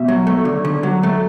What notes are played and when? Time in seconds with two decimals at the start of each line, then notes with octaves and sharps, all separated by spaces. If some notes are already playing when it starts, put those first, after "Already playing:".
Already playing: B2 E5
0.08 F#3
0.27 A3
0.45 D3
0.65 D3
0.83 F#3
1.03 A3